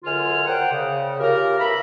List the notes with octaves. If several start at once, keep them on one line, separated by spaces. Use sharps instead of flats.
C#2 F#2 D3 F4 G#5 F6
A#4 C5 D5 F#5 G5
C#3
C#4 F4 G4 A#4
E2 F4 E5 A#5 B5